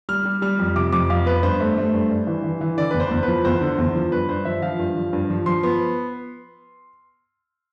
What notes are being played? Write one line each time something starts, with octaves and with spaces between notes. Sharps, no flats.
G3 F6
G3
G3 F6
F2
C3 D6
F2 D6
F2 F5
B3 B4
G2 C5
A3
A3
G2
G2
E3
E3
E3
D3 D5
E2 B4
C5
E2
F3 B4
E2 C5
D3
E2
F3
G2 B4
G2 C5
F3 E5
F3 F5
G2
F3
G2
F3
F3 C6
B3